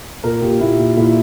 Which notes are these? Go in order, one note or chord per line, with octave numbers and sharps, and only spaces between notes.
A#2 A#4
A#2 G4
A#2 E4
A#2
A#2 E4